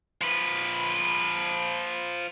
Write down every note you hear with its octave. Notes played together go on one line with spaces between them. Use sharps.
F3 B4